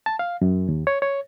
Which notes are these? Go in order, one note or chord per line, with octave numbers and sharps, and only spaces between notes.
A5
F5
F#2
D#2
C#5
C#5